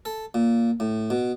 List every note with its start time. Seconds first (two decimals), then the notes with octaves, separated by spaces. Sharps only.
0.05 A4
0.34 A#2
0.80 A2
1.10 B2